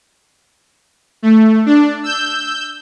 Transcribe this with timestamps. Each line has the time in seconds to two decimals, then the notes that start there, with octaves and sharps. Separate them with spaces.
1.22 A3
1.66 D4
2.03 E6 G6